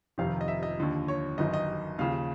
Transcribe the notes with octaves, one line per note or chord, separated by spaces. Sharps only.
F1 F2 C3 D#3 F5
D#5
E5
D#5
D#2 D3 F3
C#5
G1 F#2 D#3 D#5
D#5
D#2 C#3 F3 F5